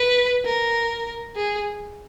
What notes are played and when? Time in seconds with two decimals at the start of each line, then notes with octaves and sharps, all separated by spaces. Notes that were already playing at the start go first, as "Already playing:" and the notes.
Already playing: B4
0.45 A#4
1.36 G#4